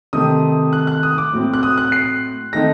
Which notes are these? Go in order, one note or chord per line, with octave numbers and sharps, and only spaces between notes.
C3 D#3 A3 C4 D#6
F#6
F#6
D#6
D6
A2 F#3 C4
F#6
D#6
F#6
C7
D#3 A3 C4 D#4 A#6